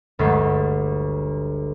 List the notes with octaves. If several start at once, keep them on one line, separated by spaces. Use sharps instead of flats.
G1 D2 G#3 B6